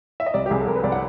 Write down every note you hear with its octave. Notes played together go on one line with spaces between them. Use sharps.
E5
D#5
C2 D5
G4
C2 G#4
A4
C2 A#4
B4
C2 D5
F#5